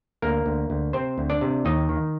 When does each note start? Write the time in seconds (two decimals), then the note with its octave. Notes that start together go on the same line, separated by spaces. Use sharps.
0.22 D2 A#3 A#4
0.46 D2
0.70 D2
0.93 C3 C4 C5
1.18 D2
1.30 D4 D5
1.41 C3
1.65 D#2 D#4 D#5
1.89 D#3